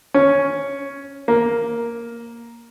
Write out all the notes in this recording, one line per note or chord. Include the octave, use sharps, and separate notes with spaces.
C#4
A#3